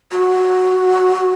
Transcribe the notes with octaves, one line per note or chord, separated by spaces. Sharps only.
F#4